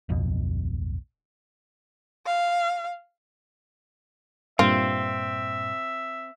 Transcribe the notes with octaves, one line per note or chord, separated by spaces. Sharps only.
D1 B1 F2 B2
F5
G2 A#2 C4 F4 E5